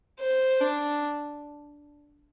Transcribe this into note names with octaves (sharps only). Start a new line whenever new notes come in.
C5
D4